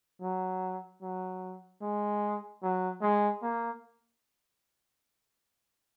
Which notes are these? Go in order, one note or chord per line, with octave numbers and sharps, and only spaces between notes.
F#3
F#3
G#3
F#3
G#3
A#3